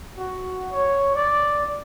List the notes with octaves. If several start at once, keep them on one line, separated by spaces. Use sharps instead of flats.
F#4
C#5
D5